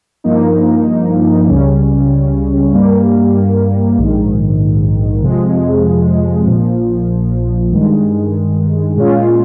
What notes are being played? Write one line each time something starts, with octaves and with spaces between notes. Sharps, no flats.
G2 F3 A#3 D#4
C#2 C#3 G3 C#4
G2 G3 A#3
A#1 G#2 D#3
F2 C3 F3 G#3
A#1 A#2 F3
G2 D#3 G#3
A#2 G#3 C#4 F4